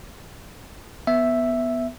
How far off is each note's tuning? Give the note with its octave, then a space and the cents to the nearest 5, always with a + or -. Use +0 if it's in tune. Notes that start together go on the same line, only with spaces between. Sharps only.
B3 +0 E5 +0